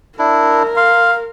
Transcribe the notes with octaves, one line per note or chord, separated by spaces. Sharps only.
D4 E4 A#4
F5 C6